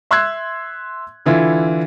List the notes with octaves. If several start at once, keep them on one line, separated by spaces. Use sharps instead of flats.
E5 C6 E6 F#6 G#6
D3 E3 E4 F4